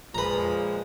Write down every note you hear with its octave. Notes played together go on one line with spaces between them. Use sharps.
A#2 F3 G#3 B4 A#5